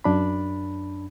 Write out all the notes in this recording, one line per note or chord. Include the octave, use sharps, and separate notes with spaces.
F#2 D4 B5